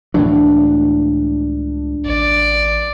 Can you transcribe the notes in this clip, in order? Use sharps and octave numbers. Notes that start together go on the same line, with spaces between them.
C#2 A2 E3 F#3 D4
A1 D5